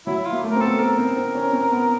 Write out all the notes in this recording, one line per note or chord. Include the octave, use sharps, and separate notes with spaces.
F#3 E4
F4
A#3
A3
C4 A#4
B3 A4
B3 A#4
C4
C4
C#4
C4
B3